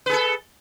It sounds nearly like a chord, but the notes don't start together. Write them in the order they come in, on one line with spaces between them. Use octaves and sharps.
B4 G#4 A4